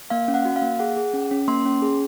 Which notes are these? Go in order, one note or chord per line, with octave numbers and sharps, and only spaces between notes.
A#3 F5
C#4
F#5
F#4
F5
A#3
G#4 F#5
G#4
C#4
C#4
A#3 C6
C#4
G#4